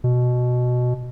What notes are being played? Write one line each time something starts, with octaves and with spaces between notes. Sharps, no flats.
B2